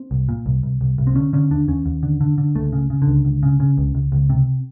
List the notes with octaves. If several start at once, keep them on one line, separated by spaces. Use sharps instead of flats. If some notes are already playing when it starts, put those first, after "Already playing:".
Already playing: C4
C2
A#2
C2
C2
C2
C2
C4
D3 C#4
D3 C#4
D#2 D4
D#2 C#4
D#2
D3
D3
D3
C#2 A3
C#3
C#3
D3
C#2
C#2
C#3
C#3
C#2
C#2
C#2
C3